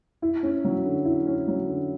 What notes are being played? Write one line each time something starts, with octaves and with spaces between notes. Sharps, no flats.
E4
C#4
F#3
D3
E4
C#4
F#3
D3